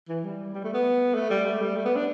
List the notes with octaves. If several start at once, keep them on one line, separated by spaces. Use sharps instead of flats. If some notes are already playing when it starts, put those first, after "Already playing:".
E3
G3
G3
A3
B3
A3
G3
A3
G3
A3
B3
D4